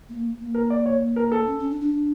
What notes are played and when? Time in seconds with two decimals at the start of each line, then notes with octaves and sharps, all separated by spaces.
0.09 A#3
0.40 A#3
0.54 A#4
0.70 D5
0.86 C#5
1.16 A#4
1.32 A4
1.47 C#4
1.59 C#4
1.71 D4
1.81 D4